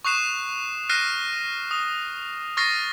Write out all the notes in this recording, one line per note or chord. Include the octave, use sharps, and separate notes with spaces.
C#6 D#6 F#6 C7 E7
F6 F#6 A#6 C7 D#7
D#6
C#6 F6 A6 A#6 C7